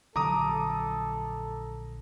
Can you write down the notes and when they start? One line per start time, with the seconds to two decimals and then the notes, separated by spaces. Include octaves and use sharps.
0.16 A#1 D3 F#3 A4 A#5 D6 D#6